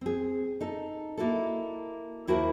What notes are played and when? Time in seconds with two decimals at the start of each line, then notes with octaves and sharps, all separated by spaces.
0.01 C4 G#4
0.61 D#4 A4
1.17 A#3 E4 F#4 A4
2.27 D#2 E4 F#4 A#4 C5 A5